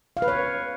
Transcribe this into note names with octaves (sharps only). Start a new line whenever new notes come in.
F5
B4
C#5